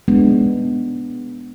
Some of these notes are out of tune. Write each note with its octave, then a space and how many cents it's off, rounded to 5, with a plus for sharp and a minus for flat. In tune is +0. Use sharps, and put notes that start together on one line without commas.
G#3 +0 B3 +0 D4 +0